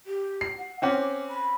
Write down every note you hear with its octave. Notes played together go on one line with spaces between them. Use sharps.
G4
C7
F#5
C4 C#4 F#5 D6
B5